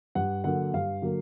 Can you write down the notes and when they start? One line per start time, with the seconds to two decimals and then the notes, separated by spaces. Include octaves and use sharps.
0.15 G2 F#5
0.44 D3 F#3 A#3 F#5
0.74 G2 F5
1.02 D3 F#3 A#3